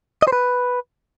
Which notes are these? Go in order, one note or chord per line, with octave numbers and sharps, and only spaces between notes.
D#5
C5
B4